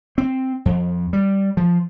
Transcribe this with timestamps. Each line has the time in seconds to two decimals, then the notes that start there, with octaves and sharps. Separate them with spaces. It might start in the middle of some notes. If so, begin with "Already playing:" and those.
0.18 C4
0.65 F2
1.13 G3
1.57 F3